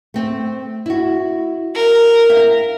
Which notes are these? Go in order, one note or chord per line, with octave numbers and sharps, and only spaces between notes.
A3 C4
E4 F#4
A#4
E5 F5